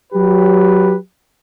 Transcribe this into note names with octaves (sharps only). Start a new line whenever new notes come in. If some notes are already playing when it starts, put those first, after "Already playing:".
F#3 G4 B4